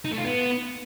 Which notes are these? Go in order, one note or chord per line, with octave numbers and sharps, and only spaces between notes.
D#4
A3
F4
B3